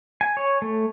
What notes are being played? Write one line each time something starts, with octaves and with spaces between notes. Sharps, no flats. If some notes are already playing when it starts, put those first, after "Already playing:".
G#5
C#5
A3